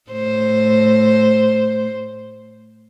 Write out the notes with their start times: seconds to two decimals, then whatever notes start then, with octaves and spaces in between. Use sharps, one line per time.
0.11 A2 C5